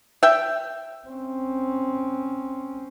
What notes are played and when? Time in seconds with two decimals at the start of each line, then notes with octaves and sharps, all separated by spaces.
0.23 E5 G5
1.08 C4 C#4